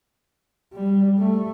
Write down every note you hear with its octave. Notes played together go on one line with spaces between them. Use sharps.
G3
A3